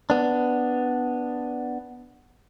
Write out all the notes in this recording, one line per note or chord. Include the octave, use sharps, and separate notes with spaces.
B3 D4